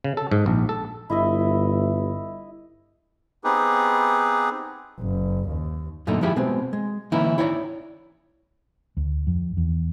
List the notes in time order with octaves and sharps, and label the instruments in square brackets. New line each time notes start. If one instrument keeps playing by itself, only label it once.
[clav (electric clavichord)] C#3
A4
G#2
A#1
A4
[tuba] G1 [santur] E4 D#5 E5
[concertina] B3 C4 D#4 G4 G#4 B4
[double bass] F#1
D#2
[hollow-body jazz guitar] F#2 A#2 D3 A3 D#4
F3 G#3 E4 G4 G#4
B2 G#3 C4
G#3
D3 E3 A#3 C#4 D#4 E4
E4 C#5 D5 G5 A#5
[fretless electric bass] D2
F2
E2